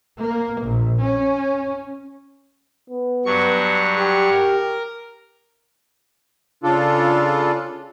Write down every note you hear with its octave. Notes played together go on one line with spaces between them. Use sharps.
A#3
A#1
C#4
B3
G2 F#3 C#6
G4
A#4
C#3 D4 F4 A4